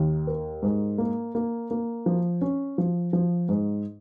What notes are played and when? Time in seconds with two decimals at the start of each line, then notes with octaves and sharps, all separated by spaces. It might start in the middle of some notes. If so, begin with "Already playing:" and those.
Already playing: D#2 D#3
0.27 A#4
0.62 G#2
0.98 A#3
1.35 A#3
1.71 A#3
2.06 F3
2.41 C#4
2.78 F3
3.13 F3
3.49 G#2